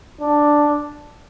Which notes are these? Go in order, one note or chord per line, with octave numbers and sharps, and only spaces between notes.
D4